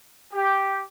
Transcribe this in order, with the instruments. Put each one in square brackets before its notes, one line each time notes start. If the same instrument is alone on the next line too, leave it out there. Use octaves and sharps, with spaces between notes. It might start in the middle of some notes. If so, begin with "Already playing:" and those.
[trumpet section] G4